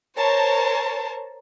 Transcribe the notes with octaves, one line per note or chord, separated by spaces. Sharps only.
A#4 C5 C#5 A5